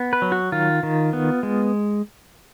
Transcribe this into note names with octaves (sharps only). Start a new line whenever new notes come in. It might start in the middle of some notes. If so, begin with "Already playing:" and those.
Already playing: B3
B4
F#3
F#4
D#3 F4
D#3
B3
G#3